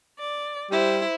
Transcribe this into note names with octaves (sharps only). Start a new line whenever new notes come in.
D5
G3 E4 C5